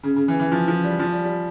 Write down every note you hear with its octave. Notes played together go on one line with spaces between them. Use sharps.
C#3
C#3
E3
E3
F3
F3
G3
F3
G3
G3